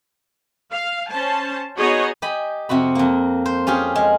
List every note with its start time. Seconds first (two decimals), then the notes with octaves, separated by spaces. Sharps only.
0.72 F5
1.10 C#4 C5 A5
1.78 B3 D#4 F#4 G#4 C#5 D#5
2.22 G4 D#5 G#5 B5
2.69 F2 C3 C4 F#4 B5
2.95 F2 A#3
3.46 C5
3.67 C#4 F4 G4 G#4
3.96 G#3